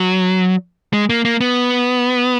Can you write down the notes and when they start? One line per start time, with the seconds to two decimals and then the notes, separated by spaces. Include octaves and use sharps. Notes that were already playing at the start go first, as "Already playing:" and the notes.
Already playing: F#3
0.93 G#3
1.10 A#3
1.25 A#3
1.41 B3